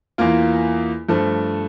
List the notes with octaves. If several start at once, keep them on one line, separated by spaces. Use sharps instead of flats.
E2 E3 A#3 F4
G2 F3 A3